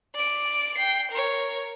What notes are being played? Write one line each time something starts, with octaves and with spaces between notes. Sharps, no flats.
D5 D7
G5 C7
A#4 C#5